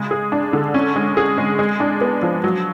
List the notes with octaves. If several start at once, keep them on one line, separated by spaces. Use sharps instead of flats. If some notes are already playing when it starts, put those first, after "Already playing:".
Already playing: C#3 G#3
G#4
D4
D3
C#4
G#3
G#4
G#3
G#3
D4
B3
F3
F#3